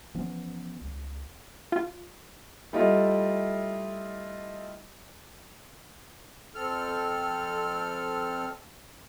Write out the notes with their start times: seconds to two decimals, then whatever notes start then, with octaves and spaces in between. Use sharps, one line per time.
0.15 E3 F3 B3 C#4
0.81 C#2
1.72 F4
2.73 G3 A3 E4 F4 D#5
6.55 F2 C4 A4 F6